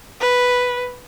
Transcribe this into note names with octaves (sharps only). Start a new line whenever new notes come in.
B4